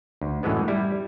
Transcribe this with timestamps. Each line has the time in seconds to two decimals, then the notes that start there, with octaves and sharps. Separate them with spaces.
0.21 D2
0.43 F#2 A2 E3 G#3 B3
0.68 G3 E4